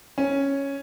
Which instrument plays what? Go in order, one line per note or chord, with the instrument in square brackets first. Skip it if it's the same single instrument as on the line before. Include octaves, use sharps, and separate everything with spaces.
[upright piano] C#4